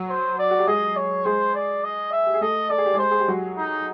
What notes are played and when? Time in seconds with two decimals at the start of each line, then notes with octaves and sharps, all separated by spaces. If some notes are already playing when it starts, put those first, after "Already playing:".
Already playing: F#3 F#4
0.10 C5
0.39 D5
0.51 F#4
0.59 G4
0.67 G#3 G#4 D#5
0.97 C#5
1.25 G#3 G#4 C5
1.55 D5
1.84 D#5
2.12 E5
2.27 G4
2.34 G#4
2.41 A3 A4 D#5
2.70 A4 D5
2.78 G#4
2.86 G4
2.94 G#3 G#4 C5
3.11 G#4
3.20 G4
3.28 F#3 F#4
3.58 D#4